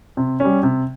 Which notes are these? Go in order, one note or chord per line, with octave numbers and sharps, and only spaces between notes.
C3
G3 C#4
C3